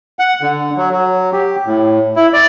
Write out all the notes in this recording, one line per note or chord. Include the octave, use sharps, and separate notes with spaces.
F#5
D3
F#3
F#3
G4
A2
E4
D5